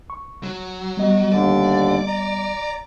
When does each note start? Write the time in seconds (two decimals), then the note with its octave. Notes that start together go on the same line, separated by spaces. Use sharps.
0.10 C#6
0.43 F#3
0.97 G3 B3 D#5
1.32 D#2 D3 D5
2.07 A#5